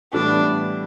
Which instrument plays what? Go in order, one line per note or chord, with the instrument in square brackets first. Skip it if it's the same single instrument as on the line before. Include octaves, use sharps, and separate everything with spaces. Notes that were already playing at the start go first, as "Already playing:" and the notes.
[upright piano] A2 E3 G3 B3 [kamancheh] D4